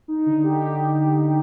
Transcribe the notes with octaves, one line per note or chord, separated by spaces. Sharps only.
D#4
D3
G4